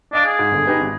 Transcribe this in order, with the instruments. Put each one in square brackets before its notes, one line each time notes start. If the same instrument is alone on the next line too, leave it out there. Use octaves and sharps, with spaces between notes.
[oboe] D4 [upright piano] D#5 F5 D7
[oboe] G#4
[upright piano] G#2
G1 D3
D#4 G4 B4
G#1